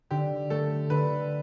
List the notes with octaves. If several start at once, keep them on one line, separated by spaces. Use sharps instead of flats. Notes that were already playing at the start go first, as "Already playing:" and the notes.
D3 G4
A3 A4
D3 B4